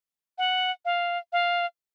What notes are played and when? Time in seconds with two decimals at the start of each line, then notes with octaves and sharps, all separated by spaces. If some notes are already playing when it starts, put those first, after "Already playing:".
0.38 F#5
0.85 F5
1.33 F5